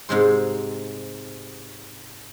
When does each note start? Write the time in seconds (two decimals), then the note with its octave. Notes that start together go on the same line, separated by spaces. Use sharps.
0.09 G#2 C3 G#3 C5